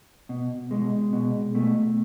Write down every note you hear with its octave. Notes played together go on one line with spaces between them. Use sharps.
B2
B2 G#3
B2
B2 A3